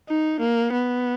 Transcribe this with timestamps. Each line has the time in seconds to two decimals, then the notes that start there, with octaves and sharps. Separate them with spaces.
0.09 D#4
0.40 A#3
0.73 B3